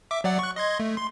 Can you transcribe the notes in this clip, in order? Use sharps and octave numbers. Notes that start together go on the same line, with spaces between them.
E5 D6
F#3 D5 F#5
C#6 F#6
D#5 C6 G#6
A3
C6